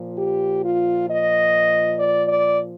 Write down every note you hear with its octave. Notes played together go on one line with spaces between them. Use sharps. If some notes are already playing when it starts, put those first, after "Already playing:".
Already playing: A#2 F3
G4
F4
D#5
D5
D5